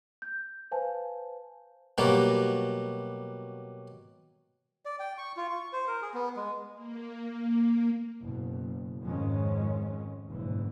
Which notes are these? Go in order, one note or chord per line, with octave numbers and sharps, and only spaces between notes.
G6
B4 C5 F5 G#5 A5
B2 F#3 G3 A#3
D5
G5
C#6
F4
C#6
C5
A#4
G#4
B3
G#3
A#3
F#1 B2
F2 G#2 D#3 G#3 C#4
F#1 G#2 B2 D3 E3